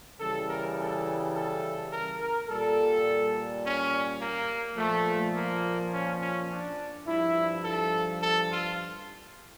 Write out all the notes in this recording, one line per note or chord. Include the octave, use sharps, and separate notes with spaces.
C#3 E3 G3 A4
A#4
A4
A4
A#4
A#4
A#2 G3 A4
C#4
A#3
A#2 F3 A3
A#3
C#4
C#4
D4
G2 F3 E4
A4
A4
F4